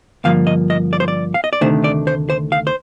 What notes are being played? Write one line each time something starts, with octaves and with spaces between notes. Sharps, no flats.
G2 D3 F3 A#3 F5
D#5
D#5
D5
C5
D5
F5
D#5
D5
D2 C3 D#3 A3 D4 C5
D5
C5
C5
F5
C5